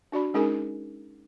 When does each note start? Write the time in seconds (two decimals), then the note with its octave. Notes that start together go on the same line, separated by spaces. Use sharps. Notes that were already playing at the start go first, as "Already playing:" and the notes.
0.12 D4 F#4 D5 B5
0.34 G#3 C#4 D#4 G#4 A#4 G#5